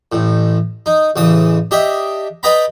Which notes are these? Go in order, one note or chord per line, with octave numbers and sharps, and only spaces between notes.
A1 A2
D#4
A1 C#3 E3 D#6
D4 G4 D#5 E5
B4 D5 D#5 G5 A#5 B5